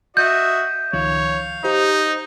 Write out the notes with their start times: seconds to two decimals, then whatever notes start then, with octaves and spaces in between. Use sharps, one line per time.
0.17 F#4 D#5 E5 G6
0.93 C#2 D#3 F3 C#5 F5
1.64 D#4 G4 C5